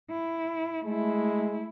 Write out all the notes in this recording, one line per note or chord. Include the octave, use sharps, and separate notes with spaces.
E4
G#3 A3 E4